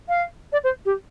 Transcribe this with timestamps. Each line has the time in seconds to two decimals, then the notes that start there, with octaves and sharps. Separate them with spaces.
0.08 F5
0.52 D5
0.63 C5
0.85 G4